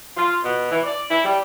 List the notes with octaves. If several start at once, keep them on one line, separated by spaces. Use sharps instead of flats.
F4
B2
E3
D5
E4
G3